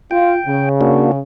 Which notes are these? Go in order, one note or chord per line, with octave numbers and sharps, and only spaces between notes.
F4 G5
C#3
A#3 D4 F#4